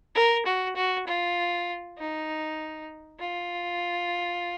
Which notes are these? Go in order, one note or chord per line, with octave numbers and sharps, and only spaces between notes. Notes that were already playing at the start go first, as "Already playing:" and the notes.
A#4
F#4
F#4
F4
D#4
F4